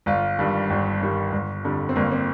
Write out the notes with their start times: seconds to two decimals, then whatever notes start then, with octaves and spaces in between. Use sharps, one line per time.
0.06 G1 F4
0.39 G2 D#3 G3
0.70 G1
1.01 G2 D#3 G3
1.32 G1
1.64 F2 D3 G3
1.89 C4
1.96 G1 A#3
2.11 C4